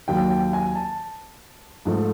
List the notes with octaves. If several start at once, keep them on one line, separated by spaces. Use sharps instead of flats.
D#2 D#3 F#3 G5
G5
G#5
A5
G#2 F3 A3